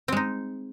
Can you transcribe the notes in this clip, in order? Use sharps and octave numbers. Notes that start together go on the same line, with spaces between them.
G#3 C4 D#4